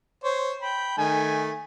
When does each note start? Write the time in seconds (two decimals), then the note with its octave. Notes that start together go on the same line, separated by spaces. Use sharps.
0.24 C5 C#5
0.62 G5 B5
0.98 D#3 A3 G#5